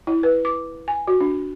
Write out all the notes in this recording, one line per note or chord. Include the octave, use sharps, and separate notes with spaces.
E4
B4
D6
G#5
F#4
D4